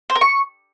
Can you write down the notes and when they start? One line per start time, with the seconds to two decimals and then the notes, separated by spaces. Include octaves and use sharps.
0.10 C5
0.15 A#4
0.21 C#6